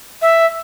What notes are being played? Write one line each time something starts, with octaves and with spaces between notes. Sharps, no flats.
E5